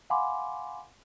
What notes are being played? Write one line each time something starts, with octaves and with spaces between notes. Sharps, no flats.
F5 F#5 G#5 B5 C6 D6